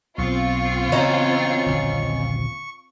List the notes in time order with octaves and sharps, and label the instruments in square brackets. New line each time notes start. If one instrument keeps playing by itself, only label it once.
[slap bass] B1 [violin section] C4 F4 [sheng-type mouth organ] C#6
[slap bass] C#3 E3 B3 [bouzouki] C#4 D#4 F#4
[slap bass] D#1 A#1 D3